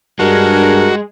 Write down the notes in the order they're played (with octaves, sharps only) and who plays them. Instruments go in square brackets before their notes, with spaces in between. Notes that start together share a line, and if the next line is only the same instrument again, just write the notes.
[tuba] G2 [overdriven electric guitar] G#3 [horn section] D4 G#4 A#4 [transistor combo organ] F#4